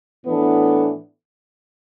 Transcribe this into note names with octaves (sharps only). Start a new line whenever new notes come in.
A2 E3 B3 D4 A4